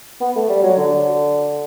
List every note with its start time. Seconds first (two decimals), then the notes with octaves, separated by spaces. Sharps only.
0.21 B3
0.36 A3
0.49 G3
0.63 F#3
0.77 D3